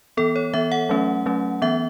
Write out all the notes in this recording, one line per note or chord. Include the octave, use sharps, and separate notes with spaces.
E3 B3 A4
C#5
E3 B3 E5
F#5
F#3 A3 C#4
F#3 A3 C#4
E3 B3 E5